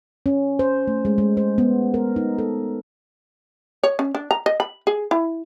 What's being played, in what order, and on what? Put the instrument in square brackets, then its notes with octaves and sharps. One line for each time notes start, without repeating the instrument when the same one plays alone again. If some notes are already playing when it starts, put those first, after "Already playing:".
[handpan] C#4
C5
A3
G#3
G#3
C5
B3
A#4
D#4
A4
[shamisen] C#5
C#4
D4
A#5
D#5
B5
G#4
E4